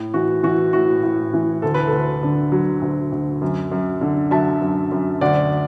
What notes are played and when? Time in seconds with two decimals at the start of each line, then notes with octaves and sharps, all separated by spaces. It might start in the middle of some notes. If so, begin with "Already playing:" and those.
Already playing: A2
0.14 E3 F#4
0.43 E3 F#4
0.73 A2 F#4
1.03 A2
1.34 E3
1.62 D2 A4
1.74 B4
1.88 D2 A4
2.23 D3
2.52 F#3
2.82 D2
3.12 D2
3.42 F#2
3.71 F#2
4.01 D3
4.31 F#3 E5 A5
4.62 F#2
4.92 F#2
5.21 D2 D5 F#5